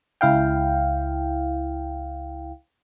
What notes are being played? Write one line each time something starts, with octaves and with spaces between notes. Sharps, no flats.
C#2 E4 F5 G5